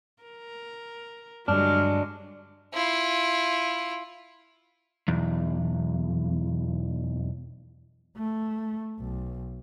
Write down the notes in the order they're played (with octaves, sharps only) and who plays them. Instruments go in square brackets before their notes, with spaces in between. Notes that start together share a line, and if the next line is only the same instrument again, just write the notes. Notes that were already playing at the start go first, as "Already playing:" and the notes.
[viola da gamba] A#4
[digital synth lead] G2 [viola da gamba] D3 F#3 G#3 [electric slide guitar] D4 [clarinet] F6
[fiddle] E4 F4
[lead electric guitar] B1 E2
[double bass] A3
B1